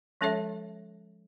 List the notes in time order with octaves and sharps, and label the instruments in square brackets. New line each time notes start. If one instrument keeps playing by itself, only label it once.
[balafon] F3 G#3 C#4 A4 C#5 E5